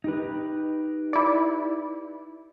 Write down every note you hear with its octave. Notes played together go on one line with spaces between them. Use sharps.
D#4 G4 B4
E4 D5